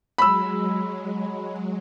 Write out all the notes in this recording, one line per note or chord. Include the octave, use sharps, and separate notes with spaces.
F#3 G#3 B5 E6